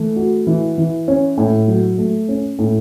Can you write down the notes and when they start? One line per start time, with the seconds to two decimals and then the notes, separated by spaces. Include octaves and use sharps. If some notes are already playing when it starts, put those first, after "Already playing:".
Already playing: E3 A3
0.16 F#4
0.47 E3
0.78 E3
1.08 C#4
1.38 A2
1.68 F#3
1.98 A3
2.28 C#4
2.59 A2